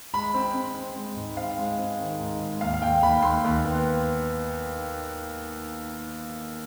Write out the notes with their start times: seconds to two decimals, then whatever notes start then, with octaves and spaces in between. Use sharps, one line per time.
0.14 G#3 B5
0.34 C4
0.54 C4
0.75 C4
0.96 G#3
1.16 G#2
1.37 C4 F5
1.58 G#3
1.78 C4
1.99 D#3
2.19 G#2
2.40 G#3
2.61 D#2 F5
2.74 F5
2.81 D#2 G5
3.02 D#2 B5
3.23 D#2 C6
3.44 D#2
3.64 B3